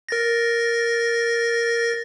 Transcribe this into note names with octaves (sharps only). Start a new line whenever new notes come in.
A#4 A6 A#6